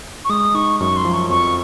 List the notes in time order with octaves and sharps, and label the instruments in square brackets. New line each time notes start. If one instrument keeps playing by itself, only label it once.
[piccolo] C#6
[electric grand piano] G#3 [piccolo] D#6
[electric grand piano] D#4 [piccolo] C#6
[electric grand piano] F#2 [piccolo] C#6
[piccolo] C6
[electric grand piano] F3
[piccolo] C#6
[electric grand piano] F2 [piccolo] C#6